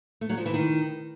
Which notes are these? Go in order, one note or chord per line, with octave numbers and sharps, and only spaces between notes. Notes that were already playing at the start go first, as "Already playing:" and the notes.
A3
F#3
F3
E3
D#3